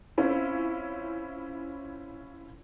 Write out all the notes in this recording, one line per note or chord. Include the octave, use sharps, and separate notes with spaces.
C4 C#4 E4 F4